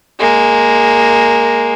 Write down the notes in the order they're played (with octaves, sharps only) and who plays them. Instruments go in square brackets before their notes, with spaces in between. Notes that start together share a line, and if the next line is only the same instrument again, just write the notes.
[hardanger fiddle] G#3 A#3